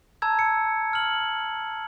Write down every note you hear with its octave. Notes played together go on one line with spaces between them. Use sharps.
A5 A#5 E6 G#6
C#7
F6 F#7